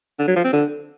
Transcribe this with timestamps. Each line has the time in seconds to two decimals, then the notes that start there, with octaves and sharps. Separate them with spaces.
0.19 D3
0.27 F#3
0.36 F3
0.44 C4
0.53 D3